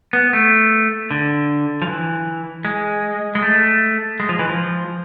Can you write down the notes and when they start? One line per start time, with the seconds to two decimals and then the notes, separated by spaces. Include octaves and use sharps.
0.13 B3
0.33 A3
1.11 D3
1.82 F3
1.87 E3
2.65 G#3
3.35 G#3
3.42 A3
4.20 G#3
4.29 F3
4.39 E3
4.49 F3